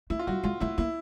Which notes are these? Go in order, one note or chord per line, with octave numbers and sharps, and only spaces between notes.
A3 E4
F4
G3 F#4
G#3 F4
A3 E4
A#3 E4